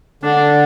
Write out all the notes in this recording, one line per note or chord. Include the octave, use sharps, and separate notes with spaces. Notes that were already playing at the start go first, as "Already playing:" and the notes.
D3 D4